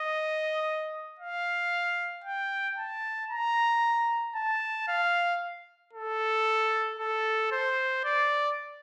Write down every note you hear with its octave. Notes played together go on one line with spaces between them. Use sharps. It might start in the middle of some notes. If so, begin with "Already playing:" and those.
Already playing: D#5
F5
G5
A5
A#5
A5
F5
A4
A4
C5
D5